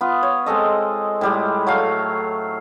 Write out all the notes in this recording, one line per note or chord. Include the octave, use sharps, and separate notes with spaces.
B3 F4
C#5
G#3 C4 A4 D#5
A2 G3 G#3
F#3 A3 F5